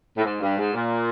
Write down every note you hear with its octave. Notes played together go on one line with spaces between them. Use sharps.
A2
G#2
G2
G#2
A#2